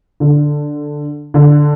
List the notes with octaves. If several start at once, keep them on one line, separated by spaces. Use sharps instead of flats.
D3
D3